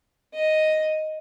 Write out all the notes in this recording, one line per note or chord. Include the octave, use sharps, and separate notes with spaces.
D#5